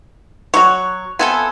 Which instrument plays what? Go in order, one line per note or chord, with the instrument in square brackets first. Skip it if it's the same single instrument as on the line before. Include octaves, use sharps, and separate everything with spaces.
[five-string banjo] F#3 F#4 [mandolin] C#5
[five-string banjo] B3 C4 F4 [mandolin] A4 E5 G#5